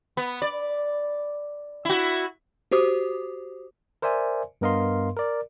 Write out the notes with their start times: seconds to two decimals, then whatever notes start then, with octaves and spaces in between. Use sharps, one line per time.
0.17 B3
0.42 D5
1.85 E4 F#4
2.72 F#4 G4 C5 D6 D#6
4.02 A#4 C5 D5 E5 G#5
4.61 G2 B3 A#4 D#5 F5 C6
5.17 A#4 D5